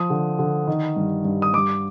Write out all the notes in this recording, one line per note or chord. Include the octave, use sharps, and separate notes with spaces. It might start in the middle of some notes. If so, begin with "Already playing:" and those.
Already playing: F3 D#6
D3
D3
D#3
G2
G2
D#6
G2 D6